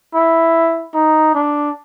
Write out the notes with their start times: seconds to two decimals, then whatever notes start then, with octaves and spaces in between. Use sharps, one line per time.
0.15 E4
0.94 D#4
1.34 D4